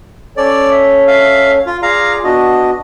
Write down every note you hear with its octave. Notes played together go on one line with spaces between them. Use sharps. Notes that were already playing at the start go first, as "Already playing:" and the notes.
C#4 A4 C#5 D5
E5
E5 F5
F4
F4 G#4 D5 F5 A#5
B3 D4 F#4 D#5